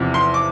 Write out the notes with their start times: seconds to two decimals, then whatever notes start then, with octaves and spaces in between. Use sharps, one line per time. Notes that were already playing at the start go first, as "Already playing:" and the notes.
Already playing: E2 C3 F3
0.14 C6
0.34 D6